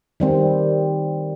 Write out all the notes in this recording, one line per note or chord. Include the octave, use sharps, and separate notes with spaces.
D#3 G3 C4